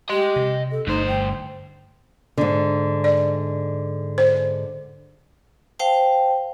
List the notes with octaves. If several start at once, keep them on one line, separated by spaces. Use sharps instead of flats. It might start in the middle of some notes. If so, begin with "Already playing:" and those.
G4 D#5 C6
C3
A4
G1 G2 A3 D#4 C5
G5
G#2 D3
D5
C5
C5 F5 G5 A5